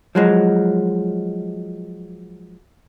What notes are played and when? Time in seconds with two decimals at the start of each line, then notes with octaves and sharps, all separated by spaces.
0.15 F3 F#3 G#3